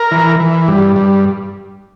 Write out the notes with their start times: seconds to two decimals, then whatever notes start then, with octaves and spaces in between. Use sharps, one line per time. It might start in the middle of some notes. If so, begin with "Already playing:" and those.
Already playing: A#4
0.11 E3
0.40 E3
0.68 G2
0.96 G2